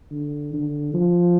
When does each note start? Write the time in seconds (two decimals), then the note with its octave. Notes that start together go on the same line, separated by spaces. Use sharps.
0.11 D3
0.53 D3
0.94 F3